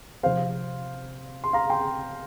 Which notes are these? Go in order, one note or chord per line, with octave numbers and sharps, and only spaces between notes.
C3 F3 C4 C5 F5
C6
F5 A#5
G5 C6